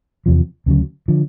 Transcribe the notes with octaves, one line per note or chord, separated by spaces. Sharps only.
E2 C3 F3
D2 C#3 F#3
D3 F3